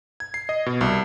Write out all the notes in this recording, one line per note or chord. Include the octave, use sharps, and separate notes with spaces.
G#6
C7
D#5
B2
C2